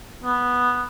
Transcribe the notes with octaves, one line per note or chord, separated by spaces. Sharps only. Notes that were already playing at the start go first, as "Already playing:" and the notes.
B3